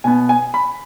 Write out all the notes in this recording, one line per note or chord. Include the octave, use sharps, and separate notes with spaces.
B2 B3 G#5
G#5
B5